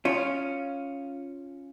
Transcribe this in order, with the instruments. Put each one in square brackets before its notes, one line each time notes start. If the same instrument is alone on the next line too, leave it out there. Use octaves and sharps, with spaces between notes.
[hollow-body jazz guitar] C#4 F4